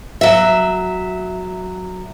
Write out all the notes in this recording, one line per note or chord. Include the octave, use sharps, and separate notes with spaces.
F#3 E5